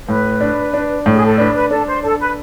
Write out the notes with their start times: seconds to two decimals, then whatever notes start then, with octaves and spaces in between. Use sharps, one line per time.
0.08 A2 B4
0.41 D4
0.74 D4
1.06 A2
1.14 G#4
1.26 A4
1.38 D4 B4
1.54 B4
1.71 D4 A4
1.87 C5
2.03 D4 A4
2.19 B4